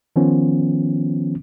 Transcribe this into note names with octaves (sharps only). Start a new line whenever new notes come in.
D#3 F3 B3 C#4